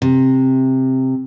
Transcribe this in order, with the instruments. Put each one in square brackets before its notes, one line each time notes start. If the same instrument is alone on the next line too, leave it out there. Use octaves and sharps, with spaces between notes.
[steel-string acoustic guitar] C3